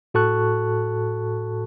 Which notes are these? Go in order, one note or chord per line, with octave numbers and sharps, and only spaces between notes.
A2 F#4 A4 A5 C#6 F#6